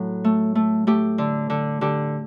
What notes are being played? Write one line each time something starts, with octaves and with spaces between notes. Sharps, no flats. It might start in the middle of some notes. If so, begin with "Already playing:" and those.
Already playing: A2 F#3
A3
A3
A3 G4
D3
D3
D3 G4